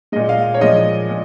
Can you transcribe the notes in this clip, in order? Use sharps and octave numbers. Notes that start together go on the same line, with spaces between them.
A#2 G#3 D#5
F5
C#5
A#2 F3 G#3 D#5
A#2